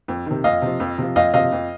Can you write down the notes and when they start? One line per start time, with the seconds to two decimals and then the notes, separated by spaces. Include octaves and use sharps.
0.08 F2
0.26 C3 D#3
0.44 F2 D#5 F5
0.62 C3 F3
0.80 F2
0.98 C3 F3
1.16 F2 D#5 F5
1.34 C3 F3 D#5 F5
1.52 F2